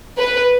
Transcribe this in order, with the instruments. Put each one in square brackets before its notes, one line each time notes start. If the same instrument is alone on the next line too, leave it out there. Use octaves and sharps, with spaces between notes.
[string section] B4